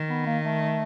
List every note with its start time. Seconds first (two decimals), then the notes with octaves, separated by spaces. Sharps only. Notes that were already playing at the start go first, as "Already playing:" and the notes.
Already playing: D#3
0.10 B3
0.26 A#3
0.44 A3